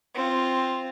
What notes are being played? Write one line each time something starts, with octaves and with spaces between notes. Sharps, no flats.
C4 F4